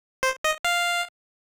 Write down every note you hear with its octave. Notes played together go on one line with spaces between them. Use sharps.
C5
D#5
F5